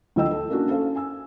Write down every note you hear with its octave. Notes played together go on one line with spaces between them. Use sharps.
D2 F3 F#3 D#5 G5 E6
A4
A#3 C#4 D4 F#4
C#4 A4 C5 F5
G#5 E6